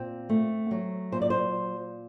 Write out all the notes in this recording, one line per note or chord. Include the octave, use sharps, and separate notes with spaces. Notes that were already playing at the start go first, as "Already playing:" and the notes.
Already playing: A#2 C4
A3
F#3
A#2 C5
D5
C5